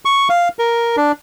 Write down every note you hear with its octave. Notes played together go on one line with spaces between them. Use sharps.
C#6
F5
A#4
D4